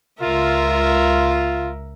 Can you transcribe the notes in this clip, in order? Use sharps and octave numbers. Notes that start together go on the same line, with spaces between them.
C#2 F4 A#4 E5